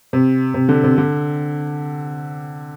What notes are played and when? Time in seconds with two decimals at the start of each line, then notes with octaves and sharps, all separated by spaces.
0.13 C3
0.54 C3
0.69 D3
0.84 C3
0.98 D3